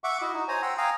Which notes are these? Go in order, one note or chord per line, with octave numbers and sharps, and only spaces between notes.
E5 F#5 C#6 D6
E4 F#4 D#5
D#4 F#4
C5 C#5 G#5 A#5
F#5 G5 C6 E6
F5 G5 G#5 A#5 D#6